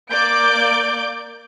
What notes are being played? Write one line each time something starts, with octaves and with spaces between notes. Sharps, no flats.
A#3 D5 D6 G6 D7